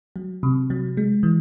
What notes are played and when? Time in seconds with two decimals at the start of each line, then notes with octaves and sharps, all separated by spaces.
0.16 F#3
0.43 C3
0.70 F#3
0.97 G#3
1.23 E3